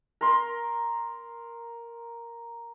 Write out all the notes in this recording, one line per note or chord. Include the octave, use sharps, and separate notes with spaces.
A#4 C6